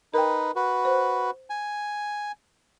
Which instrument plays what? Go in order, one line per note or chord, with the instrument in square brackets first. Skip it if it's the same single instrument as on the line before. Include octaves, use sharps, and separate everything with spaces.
[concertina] D#4 B4 [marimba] A#4 G5
[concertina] F#4 B4
[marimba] C5
[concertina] G#5